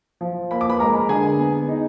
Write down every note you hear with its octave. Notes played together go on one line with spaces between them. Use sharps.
F3
A#3 B5
D6
B4 B5
G#3 A#4 A#5
D3 G#4 G#5
B3
D#4